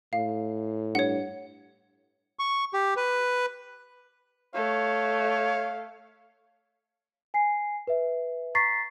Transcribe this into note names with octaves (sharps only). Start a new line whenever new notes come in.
A2 F5
G2 C#5 F#5
C#6
G4
B4
A3 C#5 F5
G#5 C7
B4 E5
A#5 C#6 A6 B6 C7